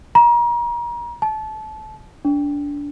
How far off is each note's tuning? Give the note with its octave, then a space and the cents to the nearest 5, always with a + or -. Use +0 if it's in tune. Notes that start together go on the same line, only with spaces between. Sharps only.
A#5 +35
A5 -25
D4 -25